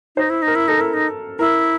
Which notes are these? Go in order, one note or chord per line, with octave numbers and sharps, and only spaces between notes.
D#4 C5
E4
D#4
A#4
E4
D#4 A4
E4 A#4
D#4
E4 A#4